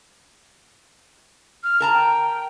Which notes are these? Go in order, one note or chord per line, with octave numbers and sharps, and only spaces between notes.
F6
A#4 A5 A#5
G5